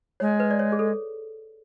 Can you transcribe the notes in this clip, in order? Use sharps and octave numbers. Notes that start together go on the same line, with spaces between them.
G#3 C#5
B4
D5
C#5
G#4
A4